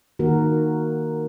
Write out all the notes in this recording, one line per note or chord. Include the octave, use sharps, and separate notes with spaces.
D#3 A#3 F#4 A#4